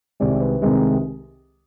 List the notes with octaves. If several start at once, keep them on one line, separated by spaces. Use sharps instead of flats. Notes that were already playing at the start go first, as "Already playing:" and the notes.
C2 C3 D#3 G#3 C4 D5
B4
C2 C3 D#3 G#3 C4